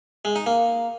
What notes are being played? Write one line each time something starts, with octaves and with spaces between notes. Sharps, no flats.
G#3
D#4
A#3